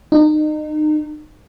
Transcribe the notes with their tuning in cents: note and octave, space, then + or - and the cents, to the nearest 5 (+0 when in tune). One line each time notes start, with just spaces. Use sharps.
D#4 -30